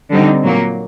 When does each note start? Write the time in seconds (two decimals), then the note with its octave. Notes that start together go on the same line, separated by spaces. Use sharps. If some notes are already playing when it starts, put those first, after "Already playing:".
0.10 D3 G3 C4 D#4
0.44 A#2 F#3 A#3